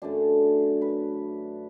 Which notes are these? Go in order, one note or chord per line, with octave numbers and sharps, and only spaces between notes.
F#2 D3 F#3 A3 D4
B4